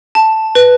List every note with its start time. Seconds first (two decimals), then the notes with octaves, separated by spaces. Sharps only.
0.15 A5
0.55 B4